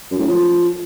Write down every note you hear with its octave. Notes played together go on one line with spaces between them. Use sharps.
F#2
A2
F3